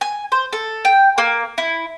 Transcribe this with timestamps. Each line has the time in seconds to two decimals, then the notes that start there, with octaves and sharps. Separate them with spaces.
0.01 G#5
0.32 C5
0.53 A4
0.85 G5
1.18 A#3
1.58 E4